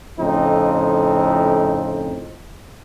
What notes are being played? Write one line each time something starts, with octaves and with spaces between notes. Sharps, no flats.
F2 A2 C#3 C4 D#4